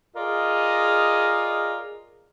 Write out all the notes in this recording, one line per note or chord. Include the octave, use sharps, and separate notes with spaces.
F4 G#4 A#4 D5 D#5